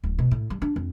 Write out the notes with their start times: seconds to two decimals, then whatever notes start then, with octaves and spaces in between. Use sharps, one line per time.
0.04 D1
0.19 B2
0.31 A2
0.50 G3
0.62 D4
0.76 F2